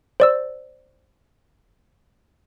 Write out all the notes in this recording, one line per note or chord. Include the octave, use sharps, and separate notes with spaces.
C5 D5 E6